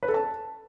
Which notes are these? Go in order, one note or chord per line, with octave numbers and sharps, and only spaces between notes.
B4
A4
A5